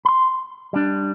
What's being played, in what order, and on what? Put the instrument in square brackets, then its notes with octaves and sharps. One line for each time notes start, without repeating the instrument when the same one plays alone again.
[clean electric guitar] B5 C6
G3 D4